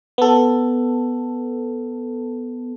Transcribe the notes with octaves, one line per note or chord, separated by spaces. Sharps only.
B3 A4